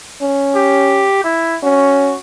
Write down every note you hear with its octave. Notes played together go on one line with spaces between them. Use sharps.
C#4
G4
E4
C#4 F#4